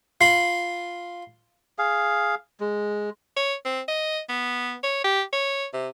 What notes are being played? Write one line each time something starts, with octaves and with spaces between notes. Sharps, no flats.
F4 B5 C7
G#4 F5
G#3
C#5
C4
D#5
B3
C#5
G4
C#5
C3